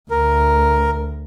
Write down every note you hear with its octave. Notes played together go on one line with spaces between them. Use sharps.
D2 A#4